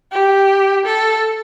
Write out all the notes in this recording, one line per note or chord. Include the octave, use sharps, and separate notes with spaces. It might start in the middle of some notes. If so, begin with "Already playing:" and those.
G4
A4